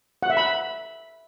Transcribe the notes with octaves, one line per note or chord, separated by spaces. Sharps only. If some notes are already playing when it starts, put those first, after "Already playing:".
F#5
E5
B5